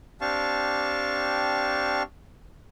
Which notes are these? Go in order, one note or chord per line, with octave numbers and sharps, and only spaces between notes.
C4 D4 G4 F5 A5 C#6